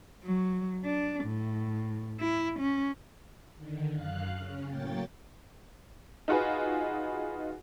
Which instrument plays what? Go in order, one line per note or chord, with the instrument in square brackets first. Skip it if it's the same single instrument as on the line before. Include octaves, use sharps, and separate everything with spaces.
[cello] F#3
D4
A2
E4
C#4
[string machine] D3 D#3
F#2 F5 F#6
C#3 C#4
A2 F#3 A#3 C#5 G5 A6
[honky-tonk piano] D#4 F4 F#4 G#4 B4